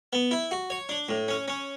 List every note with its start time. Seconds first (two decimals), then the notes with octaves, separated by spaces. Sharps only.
0.13 B3
0.31 E4
0.51 F#4
0.70 C#5
0.89 D4
1.09 A2
1.28 C#4
1.48 C#4